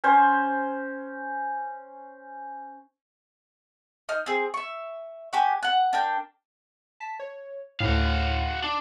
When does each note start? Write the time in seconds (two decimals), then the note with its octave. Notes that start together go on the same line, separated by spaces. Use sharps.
0.04 C#4 C5
4.09 D#4 F6
4.26 C4 G#4
4.54 E5 C#6
5.33 F#4 G4 G#5
5.63 F#5 F#6
5.93 D4 A#4 G5
7.00 A5 B6
7.19 C#5
7.80 D2 A2 F#4 F5
8.64 D4